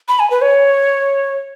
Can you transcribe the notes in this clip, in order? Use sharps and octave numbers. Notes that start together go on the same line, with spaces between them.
B5
G#5
B4
C#5